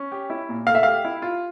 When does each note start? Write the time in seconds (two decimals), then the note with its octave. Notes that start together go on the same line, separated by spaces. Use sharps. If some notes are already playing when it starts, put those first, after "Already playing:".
Already playing: C#4
0.12 G4
0.30 E4
0.49 A#2
0.67 A3 F5
0.75 E5
0.83 G4 F5
1.05 E4
1.22 F4